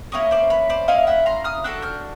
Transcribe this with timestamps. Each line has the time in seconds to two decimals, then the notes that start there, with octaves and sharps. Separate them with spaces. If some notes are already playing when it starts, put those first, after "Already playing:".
0.12 A#3 C#4 E4 C#5 D#5
0.31 C5 D5
0.50 B4 C#5
0.70 C5 D5
0.88 A#3 C#4 E4 D#5 F5
1.07 E5 F#5
1.26 A#5 C6
1.44 D#6 F6
1.64 D4 F#4 A4 E6 F#6
1.82 F6 G6